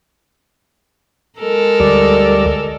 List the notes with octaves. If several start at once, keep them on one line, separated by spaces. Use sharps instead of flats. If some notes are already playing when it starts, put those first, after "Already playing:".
G#3 A4 A#4
D2 G3 D5